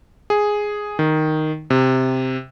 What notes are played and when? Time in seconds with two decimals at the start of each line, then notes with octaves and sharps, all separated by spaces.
0.30 G#4
0.99 D#3
1.70 C3